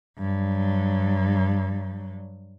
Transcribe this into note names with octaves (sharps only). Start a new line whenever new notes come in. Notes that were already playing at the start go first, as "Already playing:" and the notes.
G2 F#3